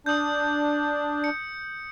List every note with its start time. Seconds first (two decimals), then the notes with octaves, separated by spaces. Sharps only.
0.06 D4 D#6 G6
1.24 C#7